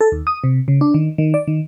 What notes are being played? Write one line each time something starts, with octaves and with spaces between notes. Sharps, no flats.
A4
D#2
D#6
C3
C#3
D4
D#3
D#3
D5
D#3